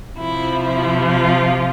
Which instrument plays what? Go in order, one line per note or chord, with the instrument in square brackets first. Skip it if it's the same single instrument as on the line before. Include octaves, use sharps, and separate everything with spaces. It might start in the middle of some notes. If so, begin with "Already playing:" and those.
[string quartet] C3 F3 E4
E4
F4